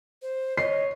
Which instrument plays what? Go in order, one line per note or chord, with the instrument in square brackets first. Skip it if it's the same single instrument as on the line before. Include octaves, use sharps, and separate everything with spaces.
[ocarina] C5
[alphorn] C#5 [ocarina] D#5 [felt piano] C7